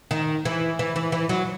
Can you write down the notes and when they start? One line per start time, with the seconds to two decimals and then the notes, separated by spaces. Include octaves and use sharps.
0.11 D#3
0.45 E3
0.79 E3
0.96 E3
1.12 E3
1.29 F#3